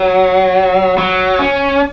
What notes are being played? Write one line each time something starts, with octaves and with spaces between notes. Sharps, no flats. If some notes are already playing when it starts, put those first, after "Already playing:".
Already playing: F#3
F#3
C#4